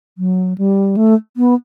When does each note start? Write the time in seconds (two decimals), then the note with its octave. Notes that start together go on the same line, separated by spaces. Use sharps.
0.18 F#3
0.58 G3
0.97 A3
1.37 B3